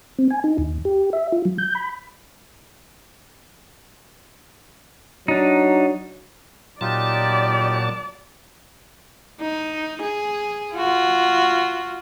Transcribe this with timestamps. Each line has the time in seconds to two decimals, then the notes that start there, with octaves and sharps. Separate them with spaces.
0.19 C4
0.31 G#5
0.44 D#4
0.58 D#2
0.85 G4
1.13 E5
1.32 F4
1.45 F#3
1.58 G6
1.75 B5
5.28 F#3 D4 D#4
6.81 A#2 F#3 D#4 F4 G4 D5 A5
9.41 D#4
10.02 G#4
10.75 F4 F#4